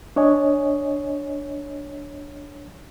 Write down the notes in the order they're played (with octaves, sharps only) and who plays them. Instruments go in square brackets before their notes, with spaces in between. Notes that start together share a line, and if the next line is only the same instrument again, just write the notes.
[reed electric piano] D4 C#5 D#5 G#5